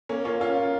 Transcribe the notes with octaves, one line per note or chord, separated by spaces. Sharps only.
A#3 C#4
C#4 F4
C#4 F4